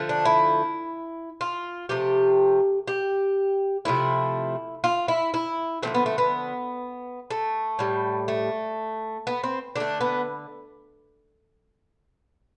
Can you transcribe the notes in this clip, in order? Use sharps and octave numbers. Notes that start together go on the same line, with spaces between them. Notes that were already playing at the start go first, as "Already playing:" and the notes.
Already playing: D3 F3 A3
D4
E4
F4
C3 F3 A3 G4
G4
C3 F3 A3 E4
F4
E4
E4
D3 F3 A3 C4
B3
A3
B3
A3
A2 G3
A3
B3
C4
D3 A3 D4
B3